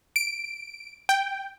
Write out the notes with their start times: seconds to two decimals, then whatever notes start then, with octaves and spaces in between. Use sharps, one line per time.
0.16 D7
1.09 G5